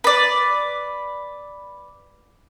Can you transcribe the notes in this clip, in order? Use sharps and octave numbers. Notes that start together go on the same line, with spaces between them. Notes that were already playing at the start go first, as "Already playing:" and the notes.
B4 D5